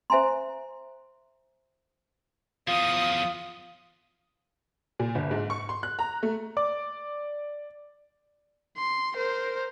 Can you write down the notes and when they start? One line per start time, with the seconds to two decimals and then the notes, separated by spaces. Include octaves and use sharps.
0.10 C5 E5 G#5 A#5 C6
2.68 E2 F3 F4 D#6
4.99 A#2
5.15 G1
5.31 G#2
5.50 C#6
5.69 C6
5.83 F#6
5.99 A#5
6.23 A3
6.57 D5 D6
8.77 C6
9.14 A#4 C5